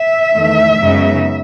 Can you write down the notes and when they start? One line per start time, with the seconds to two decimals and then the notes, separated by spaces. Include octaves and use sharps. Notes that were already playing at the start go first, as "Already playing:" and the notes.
Already playing: E5
0.33 E2 D#3 A3
0.80 F#2 C#3 G#3 B3 D#4